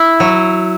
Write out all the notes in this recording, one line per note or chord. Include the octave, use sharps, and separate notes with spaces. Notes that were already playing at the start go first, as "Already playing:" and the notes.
Already playing: E4
F#3